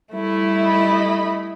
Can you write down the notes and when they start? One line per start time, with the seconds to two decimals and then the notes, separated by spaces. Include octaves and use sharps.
0.13 G3 A3 E4
0.63 D#5 B5